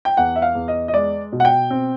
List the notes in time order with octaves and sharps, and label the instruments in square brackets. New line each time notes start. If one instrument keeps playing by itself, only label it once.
[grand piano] G5
E2 F#5
E5
F5
E2
D#5
D#5
G#3 D5
B2
F#5
G5
C4